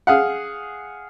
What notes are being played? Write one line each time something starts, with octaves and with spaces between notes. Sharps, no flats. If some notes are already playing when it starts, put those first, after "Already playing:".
G#4 F5 F#5